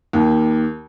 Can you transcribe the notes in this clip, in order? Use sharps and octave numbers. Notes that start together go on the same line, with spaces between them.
D#2